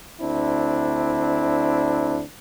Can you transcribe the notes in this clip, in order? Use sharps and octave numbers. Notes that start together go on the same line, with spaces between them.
D2 C4 D4 E4